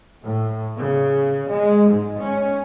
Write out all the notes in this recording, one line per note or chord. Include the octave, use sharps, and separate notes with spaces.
A2
C#3
G#3
G#2
C#4